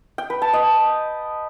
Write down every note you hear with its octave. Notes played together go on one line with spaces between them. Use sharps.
G5
B4
A5
D#5